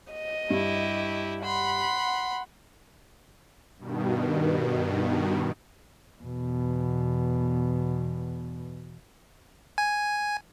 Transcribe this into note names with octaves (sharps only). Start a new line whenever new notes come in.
D#5
G2 E4 G4
F#5 B5 C6
G2 B2 D#3
E2 B2
G#5